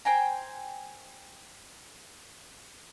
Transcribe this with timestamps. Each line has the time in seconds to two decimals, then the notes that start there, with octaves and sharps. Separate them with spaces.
0.05 C5 G5 G#5 A#5